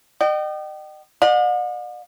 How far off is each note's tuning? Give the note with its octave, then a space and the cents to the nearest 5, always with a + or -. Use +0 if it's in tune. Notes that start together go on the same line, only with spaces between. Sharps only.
D#5 -40 G5 -35
D5 +45 F#5 -45